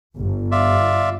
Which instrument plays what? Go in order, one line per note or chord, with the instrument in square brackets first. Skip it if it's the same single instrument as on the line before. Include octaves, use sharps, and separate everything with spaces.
[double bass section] G1
[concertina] F4 D5 E5